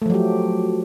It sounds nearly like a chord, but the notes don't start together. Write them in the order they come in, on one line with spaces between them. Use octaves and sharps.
A3 F3 F#3 G4